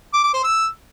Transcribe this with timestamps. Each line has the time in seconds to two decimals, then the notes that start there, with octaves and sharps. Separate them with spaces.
0.14 D6
0.24 D6
0.34 C5
0.44 E6